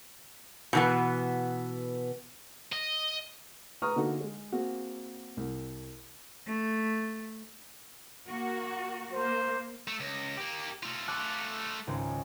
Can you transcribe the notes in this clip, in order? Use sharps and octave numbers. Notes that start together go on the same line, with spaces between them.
B2 E3 B3
D#5
B4 A#5 C#6 D#6 F6
D3 A#3 D#4 F#4 A4
G#3
A#3 C4 F#4 G#4
C2
A3
A#3 F#4
A#3 C5
A3
C#2 A#6
A#3 G4
A3 F4
A5 D6 F#6
G#1 C#2